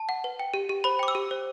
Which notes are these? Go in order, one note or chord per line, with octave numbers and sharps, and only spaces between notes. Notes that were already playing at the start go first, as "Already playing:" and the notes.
Already playing: A5
F#5
B4
G5
G4
G4
C5 B5
G5 D6
E6
G4
C5